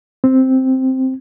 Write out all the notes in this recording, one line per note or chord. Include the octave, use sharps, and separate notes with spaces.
C4